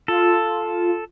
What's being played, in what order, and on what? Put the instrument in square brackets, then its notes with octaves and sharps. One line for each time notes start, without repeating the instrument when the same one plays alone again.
[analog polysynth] F4 [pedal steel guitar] A4